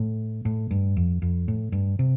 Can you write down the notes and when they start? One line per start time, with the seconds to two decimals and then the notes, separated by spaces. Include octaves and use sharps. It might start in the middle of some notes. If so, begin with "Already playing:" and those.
Already playing: A2
0.45 A2
0.71 G2
0.97 F2
1.22 F2
1.48 A2
1.72 G2
1.99 C3